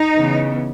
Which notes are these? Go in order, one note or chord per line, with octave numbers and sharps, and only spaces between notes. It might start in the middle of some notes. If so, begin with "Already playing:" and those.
Already playing: D#4
C#3 E3 B3